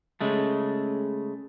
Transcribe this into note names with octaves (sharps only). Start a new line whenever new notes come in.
C#3 G#3 A3